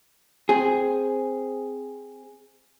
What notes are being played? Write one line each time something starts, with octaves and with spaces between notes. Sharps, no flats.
C4 G#4